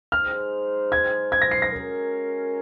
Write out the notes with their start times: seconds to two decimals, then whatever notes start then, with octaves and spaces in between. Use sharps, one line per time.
0.12 G#3 D#4 G#4 C5 F6
0.92 G#6
1.32 G#6
1.42 A#6
1.51 C7
1.62 A#6
1.71 G#3 C#4 F#4 A#4